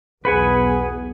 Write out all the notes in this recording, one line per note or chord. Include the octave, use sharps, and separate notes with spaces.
B1 E2 B3 G#4 B4 F#5 G#5